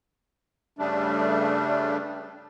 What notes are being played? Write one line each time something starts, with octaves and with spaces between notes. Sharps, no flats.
G2 C#3 G3 A3 D4